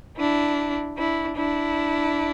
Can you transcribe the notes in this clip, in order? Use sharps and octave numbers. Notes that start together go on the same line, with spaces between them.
D4 E4
D4 E4
D4 E4